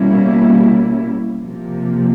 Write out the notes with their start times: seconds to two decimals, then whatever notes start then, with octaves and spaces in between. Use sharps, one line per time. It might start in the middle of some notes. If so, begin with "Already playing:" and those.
Already playing: B2 G3 A#3 C#4 E4
1.39 C3 F3 A#3